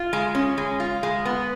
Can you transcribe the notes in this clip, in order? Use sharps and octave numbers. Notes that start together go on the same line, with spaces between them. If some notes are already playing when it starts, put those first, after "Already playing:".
Already playing: F4
G#3
C#4
G#3
F4
G#3
B3